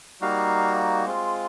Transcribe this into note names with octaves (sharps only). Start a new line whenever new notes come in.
G3 A#3 D#4 F#4 F5
G#3 C4 F4